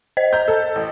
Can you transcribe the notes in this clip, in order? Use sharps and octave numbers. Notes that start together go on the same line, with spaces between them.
C5 D#5
A#5 G6
A4
A1